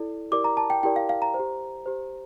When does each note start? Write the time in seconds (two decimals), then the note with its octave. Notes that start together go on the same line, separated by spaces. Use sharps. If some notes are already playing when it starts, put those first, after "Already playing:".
Already playing: E4 A4 D5
0.32 E4 G4 A#4 D5 D6
0.44 A#5
0.57 A5
0.70 G5
0.83 E4 G4 A#4 D5 G5
0.96 F5
1.09 F5
1.22 A#5
1.34 C5
1.39 G4
1.86 G4 C5